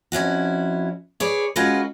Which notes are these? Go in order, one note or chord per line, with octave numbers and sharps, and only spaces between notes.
F2 C#4 E4 F#4
G#4 B4 C#5 D5
G#3 C#4 F4 F#4 A#4 B4